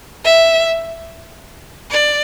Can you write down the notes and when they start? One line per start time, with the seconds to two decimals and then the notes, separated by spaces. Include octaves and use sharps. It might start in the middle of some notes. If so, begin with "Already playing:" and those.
0.24 E5
1.91 D5